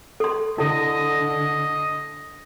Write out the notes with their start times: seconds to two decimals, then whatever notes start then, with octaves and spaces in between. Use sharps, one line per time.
0.20 A4 C6
0.58 D3 E4 A4 D#5